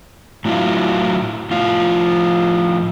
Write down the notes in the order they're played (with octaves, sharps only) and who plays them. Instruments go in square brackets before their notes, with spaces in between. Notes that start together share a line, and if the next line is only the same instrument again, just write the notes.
[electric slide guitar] A2 F#3 E4 F4
A2 F3 F4